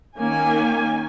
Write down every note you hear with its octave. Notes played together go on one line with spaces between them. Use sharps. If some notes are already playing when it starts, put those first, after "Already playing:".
D#3 A#3 C#4 G#5